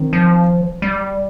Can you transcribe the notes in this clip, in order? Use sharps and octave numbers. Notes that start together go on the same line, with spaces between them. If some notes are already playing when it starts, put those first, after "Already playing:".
Already playing: D#3 C4
F3
G3